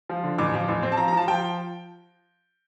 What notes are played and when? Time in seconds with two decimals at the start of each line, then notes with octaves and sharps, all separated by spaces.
0.09 F3
0.24 D3
0.38 A1 D6
0.53 F3
0.68 A1
0.83 C4
0.92 A5
0.97 F3 A#5
1.08 A#5
1.12 F3 A5
1.28 F3 G5